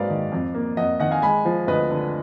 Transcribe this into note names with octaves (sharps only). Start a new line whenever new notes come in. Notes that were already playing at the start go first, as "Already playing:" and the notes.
Already playing: G#2 F#3 A#3 A#4 B4 D5 F5
D#3
F2
A#3
F2 D#5 F#5
D#3 D#5 F#5
F5 G#5
G#3 G#5 B5
F3
D2 B4 D#5
D3